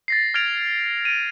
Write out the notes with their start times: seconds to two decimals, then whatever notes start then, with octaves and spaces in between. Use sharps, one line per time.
0.08 A6 A#6 C7
0.34 F6 G#6 A6 D7 F7
1.05 D7 D#7